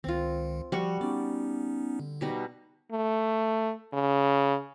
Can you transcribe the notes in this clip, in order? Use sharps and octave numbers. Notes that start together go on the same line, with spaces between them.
C#2 D#3 C4 F4
F3 G3 F#4 C#6
B3 C#4 D#4 D5
D3
B2 G3 D#4
A3
C#3